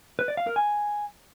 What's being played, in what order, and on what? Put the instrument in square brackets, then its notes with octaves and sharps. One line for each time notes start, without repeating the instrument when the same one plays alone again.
[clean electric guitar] B4
D5
F5
A#4
G#5